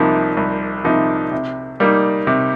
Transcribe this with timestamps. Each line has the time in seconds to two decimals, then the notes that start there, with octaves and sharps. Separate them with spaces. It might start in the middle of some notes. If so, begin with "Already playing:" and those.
Already playing: C2 C3 F3 A#3 D#4
0.37 C2
0.84 C3 F3 A#3 D#4
1.32 C3
1.80 G3 A#3 D#4
2.27 C3